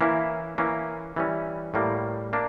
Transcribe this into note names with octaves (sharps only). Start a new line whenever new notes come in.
E3 A#3 C#4 E4
E3 A#3 C#4
E3 G3 C#4
A2 G3 A#3
A#3 D4